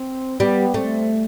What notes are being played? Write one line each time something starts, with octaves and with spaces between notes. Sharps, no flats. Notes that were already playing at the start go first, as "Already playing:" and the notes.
Already playing: C4
G3 B3
A3 C4